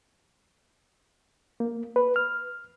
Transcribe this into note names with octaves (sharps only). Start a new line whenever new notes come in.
A#3
B4
F6